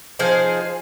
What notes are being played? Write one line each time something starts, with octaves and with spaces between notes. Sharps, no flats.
F3 D#4 G#4 C5